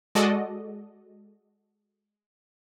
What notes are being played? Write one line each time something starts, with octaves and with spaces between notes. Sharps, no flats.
G#3 F#4 A4 D5 D#5